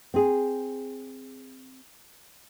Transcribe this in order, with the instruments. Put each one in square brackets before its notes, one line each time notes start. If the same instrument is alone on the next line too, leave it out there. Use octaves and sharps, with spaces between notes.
[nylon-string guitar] C4 G#4